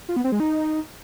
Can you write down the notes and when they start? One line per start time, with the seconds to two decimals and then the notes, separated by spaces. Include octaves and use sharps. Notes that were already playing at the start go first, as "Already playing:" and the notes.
0.09 F4
0.16 B3
0.24 C4
0.32 G#3
0.40 D#4